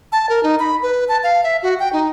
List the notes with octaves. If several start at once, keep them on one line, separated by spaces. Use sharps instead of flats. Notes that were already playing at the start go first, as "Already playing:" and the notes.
A5
A#4
D#4
B5
B4
A5
F5
E5
F#4
G5
D#4